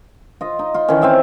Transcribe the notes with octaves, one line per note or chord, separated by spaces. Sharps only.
F4 D#5
D#4
F4 C6
D#3 E3 C#4
C4 E5 F5